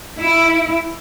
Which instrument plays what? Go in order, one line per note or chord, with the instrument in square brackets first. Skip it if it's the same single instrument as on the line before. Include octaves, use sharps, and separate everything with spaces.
[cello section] E4